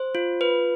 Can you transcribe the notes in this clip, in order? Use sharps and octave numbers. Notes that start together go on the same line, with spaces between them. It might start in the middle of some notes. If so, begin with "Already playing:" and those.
Already playing: C5
F4
B4